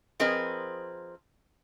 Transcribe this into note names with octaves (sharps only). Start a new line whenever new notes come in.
F3 C4 G#4 A#4 B4 D#5